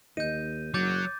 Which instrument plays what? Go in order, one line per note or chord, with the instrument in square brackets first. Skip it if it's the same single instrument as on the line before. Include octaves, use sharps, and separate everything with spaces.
[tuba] D#2 [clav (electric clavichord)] D#4 [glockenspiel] G6 D#7
[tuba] F#1 [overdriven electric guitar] F#3 [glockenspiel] D6 G6 A6